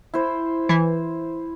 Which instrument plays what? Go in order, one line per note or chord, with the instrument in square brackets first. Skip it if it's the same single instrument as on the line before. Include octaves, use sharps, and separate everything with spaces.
[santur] E4 C5
[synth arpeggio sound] E3